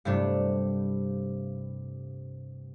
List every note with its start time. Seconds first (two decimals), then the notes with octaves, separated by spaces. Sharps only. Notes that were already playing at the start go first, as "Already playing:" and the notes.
0.05 G2 C3 A3 D4